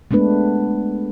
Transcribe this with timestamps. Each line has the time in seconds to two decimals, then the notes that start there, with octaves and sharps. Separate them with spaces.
0.11 G#3 A3 B3 D4 B4